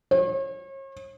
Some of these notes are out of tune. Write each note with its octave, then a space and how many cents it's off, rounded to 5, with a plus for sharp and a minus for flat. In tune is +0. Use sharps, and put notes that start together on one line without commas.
C#5 -40